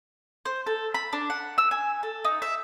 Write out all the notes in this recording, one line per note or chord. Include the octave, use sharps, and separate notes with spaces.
C5
A4
B5
D4
F#5
E6
G#5
A4
D#4
E5